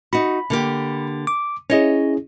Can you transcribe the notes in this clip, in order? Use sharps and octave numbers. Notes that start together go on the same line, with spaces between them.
D#4 F#4 B5
D3 A#3 G4
D6
C#4 E4 G#4 C#5 D#5